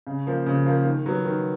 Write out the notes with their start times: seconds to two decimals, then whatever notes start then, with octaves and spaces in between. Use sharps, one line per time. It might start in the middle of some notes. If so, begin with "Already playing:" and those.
0.07 C#3
0.27 F3 A#3
0.46 C#3
0.66 F3 A#3
0.85 D#3
1.06 F#3 B3
1.25 D#3